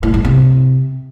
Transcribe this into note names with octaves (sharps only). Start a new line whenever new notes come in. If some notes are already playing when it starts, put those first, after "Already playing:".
A2
G#2
C3